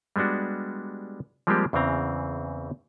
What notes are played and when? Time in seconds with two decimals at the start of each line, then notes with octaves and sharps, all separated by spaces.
0.16 G3 G#3 B3 D4 F#4
1.47 F3 G3 G#3 A#3 C4 G4
1.73 E2 C#3 E3 C4 A#5